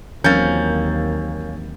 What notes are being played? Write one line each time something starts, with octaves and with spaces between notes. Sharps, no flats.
D#2 E3 F#3 A#3 C4 C#4 G6 A6